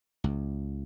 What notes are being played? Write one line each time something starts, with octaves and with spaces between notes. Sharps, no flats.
C#2